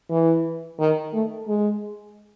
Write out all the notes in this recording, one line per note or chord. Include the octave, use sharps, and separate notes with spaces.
E3
D#3
A3
G#3